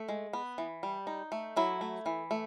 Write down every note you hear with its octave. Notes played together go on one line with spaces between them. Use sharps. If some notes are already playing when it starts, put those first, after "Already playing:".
Already playing: A3
G#3
B3
E3
G3
D#4
A3
F#3 E4
A3
E3
A3